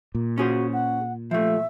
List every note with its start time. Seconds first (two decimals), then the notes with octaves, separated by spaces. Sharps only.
0.15 A#2
0.38 C#4 F#4 G#4 C5
0.73 F#5
1.31 F3 A3 E5